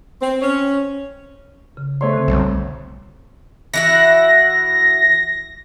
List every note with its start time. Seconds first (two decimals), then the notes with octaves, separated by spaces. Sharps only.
0.21 C4
0.41 C#4 C#5
1.77 C#3
2.01 A3 C5 C#5 C6
2.13 D3 C4
2.28 B1 F2 G3
3.74 E3 E4 F#4 A#6